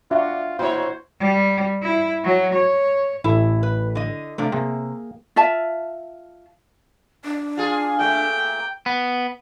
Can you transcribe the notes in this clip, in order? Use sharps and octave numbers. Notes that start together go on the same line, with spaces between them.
D4 F4 F#4 E5
A#2 E4 F#4 C5 C#5
G3
E4
F#3
C#5
A1 E4 A4
B4
D3 D#5
C3 F3 A3 D4
C3 A#3 G#4 G5
F4 E5 A5
D4
F4 G#4
A#2 A3 G5
B3